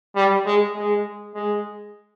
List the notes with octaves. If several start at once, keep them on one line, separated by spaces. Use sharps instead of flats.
G3
G#3
G#3
G#3